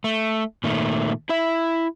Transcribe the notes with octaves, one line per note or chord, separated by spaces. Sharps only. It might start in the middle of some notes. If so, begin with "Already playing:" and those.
A3
A#2 D#3 A3
E4 E5